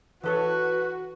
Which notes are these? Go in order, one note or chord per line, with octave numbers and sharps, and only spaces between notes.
E3 F#4 A4 B4 C#5